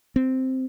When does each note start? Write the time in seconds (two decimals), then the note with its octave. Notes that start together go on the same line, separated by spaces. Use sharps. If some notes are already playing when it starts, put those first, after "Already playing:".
0.16 C4